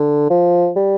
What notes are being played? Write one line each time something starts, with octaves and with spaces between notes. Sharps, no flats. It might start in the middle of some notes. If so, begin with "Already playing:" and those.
Already playing: D3
F3
G3